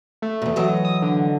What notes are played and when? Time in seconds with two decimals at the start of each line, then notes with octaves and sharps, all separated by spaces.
0.22 A3
0.42 E2 A#2
0.56 E3 F#3 D#5
0.85 D#6
1.02 D3